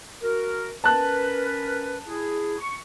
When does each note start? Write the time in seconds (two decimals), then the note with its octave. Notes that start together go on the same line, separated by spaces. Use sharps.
0.23 F#4 A#4
0.84 C#4 A#4 B4 A5 F#6
2.08 E4 G#4
2.59 C#6